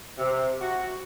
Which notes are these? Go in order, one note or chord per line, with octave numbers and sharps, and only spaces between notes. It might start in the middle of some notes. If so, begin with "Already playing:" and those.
C3
F#4